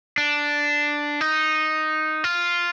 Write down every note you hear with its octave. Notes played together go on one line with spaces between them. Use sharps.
D4
D#4
F4